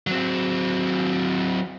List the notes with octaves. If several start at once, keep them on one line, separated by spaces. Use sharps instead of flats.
F#3 C4